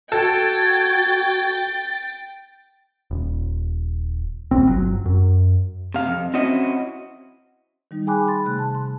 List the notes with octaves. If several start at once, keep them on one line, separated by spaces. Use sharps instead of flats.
F#4 A4 G5 G#6 A6
D#1
E1 B1 C4
G1 B2 F#3
F#2
C3 F5
F2
C4 C#4 E4 F#4 D#5
D#3 G3 D#4
G#4 G5 G#5 B5 D6 F#6
B5 C6 A6
C3 A3 F#6
A5
C6